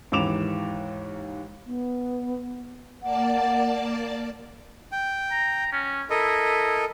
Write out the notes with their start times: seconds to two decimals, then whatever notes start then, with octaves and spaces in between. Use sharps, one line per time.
0.12 D#2 G#2 E3 D6 E7 F7
1.67 B3
3.03 A#3 D5 F#5 A5
4.92 G5
5.31 A#5
5.72 C#4
6.10 E4 A4 A#4 D#5